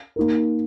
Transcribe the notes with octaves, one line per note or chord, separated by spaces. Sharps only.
A#3 D#4 A#4